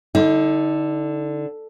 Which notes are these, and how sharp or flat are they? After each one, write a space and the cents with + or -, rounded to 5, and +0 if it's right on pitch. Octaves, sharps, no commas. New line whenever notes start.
D3 +0 D#4 +35